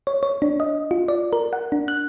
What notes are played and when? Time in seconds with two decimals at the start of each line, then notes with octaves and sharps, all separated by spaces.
0.07 C#5
0.23 C#5
0.42 D4
0.60 D#5
0.91 F4
1.08 D5
1.33 A#4
1.53 F#5
1.72 D4
1.88 F#6